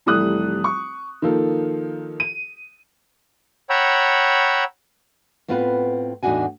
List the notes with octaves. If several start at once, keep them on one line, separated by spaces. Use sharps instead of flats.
F1 E3 G3 A3 D#6 F#6
C#6
D#3 F3 A#3 A4
D#7
C#5 F#5 G5 A#5 B5 E6
A2 B3 C4 E4 F4 B4
E2 A2 D4 D#4 F#4 G#5